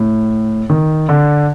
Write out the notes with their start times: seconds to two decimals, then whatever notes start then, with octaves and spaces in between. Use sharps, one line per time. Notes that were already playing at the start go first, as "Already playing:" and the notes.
Already playing: A2
0.70 D#3
1.09 D3